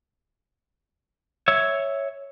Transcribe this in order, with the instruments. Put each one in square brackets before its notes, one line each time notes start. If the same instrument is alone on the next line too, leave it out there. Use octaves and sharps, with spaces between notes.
[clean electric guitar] C#5 E5